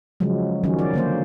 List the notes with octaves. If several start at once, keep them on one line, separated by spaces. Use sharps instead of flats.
C#3 F3 F#3 G#3
D#3 F3 F#3 C#4
D5
D3 A#3 C5